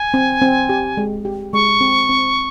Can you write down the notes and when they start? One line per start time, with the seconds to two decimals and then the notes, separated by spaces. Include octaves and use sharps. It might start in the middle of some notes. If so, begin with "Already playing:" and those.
Already playing: G#5
0.14 C4
0.42 C4
0.69 G4
0.97 G#3
1.25 G4
1.53 G#3 C#6
1.81 C4
2.09 C4